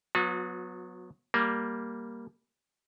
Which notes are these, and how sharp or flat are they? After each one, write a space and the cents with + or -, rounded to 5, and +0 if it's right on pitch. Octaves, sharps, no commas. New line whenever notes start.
F#3 -20 B3 +0 F#4 -45
G3 +0 A#3 +0